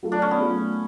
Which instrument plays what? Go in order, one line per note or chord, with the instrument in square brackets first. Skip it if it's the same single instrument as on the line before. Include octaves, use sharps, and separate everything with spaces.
[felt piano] F#3 A3 F4 A4
[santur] D4
C#4
B3
[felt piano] F#3 A3 F4 A4